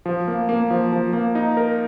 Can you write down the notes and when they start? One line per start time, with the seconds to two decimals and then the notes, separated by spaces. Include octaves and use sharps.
0.06 F3
0.28 A#3
0.49 A#3
0.70 F3
0.92 F3
1.13 A#3
1.35 D#4
1.57 A#4